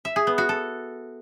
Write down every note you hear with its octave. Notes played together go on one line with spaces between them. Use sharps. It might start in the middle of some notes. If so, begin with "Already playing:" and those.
E5
G#4
B3
F#4
A4